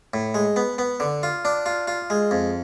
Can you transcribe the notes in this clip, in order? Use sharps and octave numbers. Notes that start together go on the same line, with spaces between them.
A2
G#3
B3
B3
D3
F4
D4
F4
F4
G#3
F2